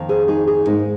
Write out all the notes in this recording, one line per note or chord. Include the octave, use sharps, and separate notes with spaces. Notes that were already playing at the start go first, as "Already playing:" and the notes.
Already playing: F2 D#3 A#3
G#4 C5
D#4 G#4
D#4 G#4
G#2 G#3 A#3 D#4